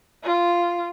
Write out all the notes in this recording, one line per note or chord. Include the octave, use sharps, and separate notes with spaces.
F4